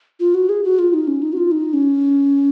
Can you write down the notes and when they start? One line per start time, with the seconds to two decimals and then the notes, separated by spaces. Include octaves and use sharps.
0.20 F4
0.34 F#4
0.49 G#4
0.64 F#4
0.79 F4
0.94 D#4
1.08 C#4
1.22 D#4
1.33 F#4
1.37 F4
1.51 D#4
1.73 C#4